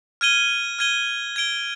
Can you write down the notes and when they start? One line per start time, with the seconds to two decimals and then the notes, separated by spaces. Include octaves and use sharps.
0.21 F6 G#6 D#7 G7
0.79 F6 G#6 D#7 G7
1.36 G#6 D7 G7